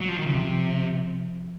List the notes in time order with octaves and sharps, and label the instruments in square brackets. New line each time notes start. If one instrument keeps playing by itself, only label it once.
[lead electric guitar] F#3
F3
D#3
C#3
[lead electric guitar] C3 [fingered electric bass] F3